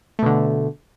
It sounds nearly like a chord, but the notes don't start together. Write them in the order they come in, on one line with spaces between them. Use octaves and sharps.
A3 B2 D3